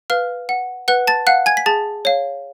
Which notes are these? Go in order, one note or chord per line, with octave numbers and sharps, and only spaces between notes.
B4 F5 F6
F#5
B4 F#5 F#6
A5 A6
F5 F#5 F#6
G#5 G#6
B6
G#4 A5 A6
C#5 F5